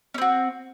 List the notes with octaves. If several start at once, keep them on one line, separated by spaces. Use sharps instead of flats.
C4 C#4 F#4